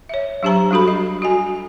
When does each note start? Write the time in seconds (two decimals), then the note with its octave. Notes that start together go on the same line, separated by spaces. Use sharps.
0.09 C#5 E5
0.43 F#3 D4 G4 C5 A5 A#5
0.71 G3 D4 F#4 A4 B5
0.88 D#5
1.22 F#4 D#5 G#5